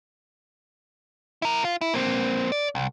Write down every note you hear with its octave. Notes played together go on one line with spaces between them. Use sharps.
E4 A#4
F4
E4
A#3 C4
D5
C2